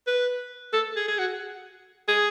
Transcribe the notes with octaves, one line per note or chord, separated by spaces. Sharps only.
B4
A4
G#4
G#4
F#4
G#4